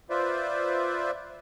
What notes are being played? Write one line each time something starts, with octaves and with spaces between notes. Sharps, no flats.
F4 B4 C5 D5 E5